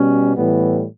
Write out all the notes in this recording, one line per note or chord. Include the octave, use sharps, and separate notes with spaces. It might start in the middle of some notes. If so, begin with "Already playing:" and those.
Already playing: B2 G3 C#4
A2 E3 G3 B3